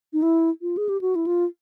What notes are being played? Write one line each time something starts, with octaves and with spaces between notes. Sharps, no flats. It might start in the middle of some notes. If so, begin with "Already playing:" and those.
D#4
E4
F4
G#4
G4
F#4
E4
F4